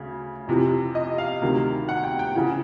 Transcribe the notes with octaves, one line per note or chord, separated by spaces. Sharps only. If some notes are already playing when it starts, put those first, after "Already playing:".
Already playing: D2 C#3
F2 C3 E3
D#5
F5
D2 C3 D#3
F#5
G5
G5
C#3 E3 F#5